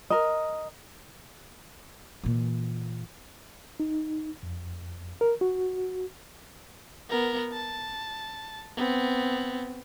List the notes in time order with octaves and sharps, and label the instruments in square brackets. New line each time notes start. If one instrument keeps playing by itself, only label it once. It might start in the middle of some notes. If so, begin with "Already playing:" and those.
[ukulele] A#4 D#5
[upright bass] A#2 E3
[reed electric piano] D#4
F2
A#4
F#4
[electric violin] B3 A#4
A5
B3 C4